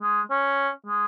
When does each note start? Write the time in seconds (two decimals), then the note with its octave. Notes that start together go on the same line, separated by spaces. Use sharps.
0.01 G#3
0.30 C#4
0.86 G#3